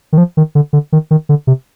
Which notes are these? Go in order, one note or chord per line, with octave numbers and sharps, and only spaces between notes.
D#3
F3
D#3
D3
D3
D#3
D#3
D3
C3